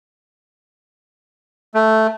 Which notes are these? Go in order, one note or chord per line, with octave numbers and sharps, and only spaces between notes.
A3